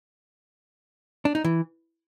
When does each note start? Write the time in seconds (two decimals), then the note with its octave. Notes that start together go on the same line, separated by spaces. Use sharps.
1.25 D4
1.35 D#4
1.44 E3